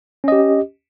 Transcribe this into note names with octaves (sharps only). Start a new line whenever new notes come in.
C#4 G4 D#5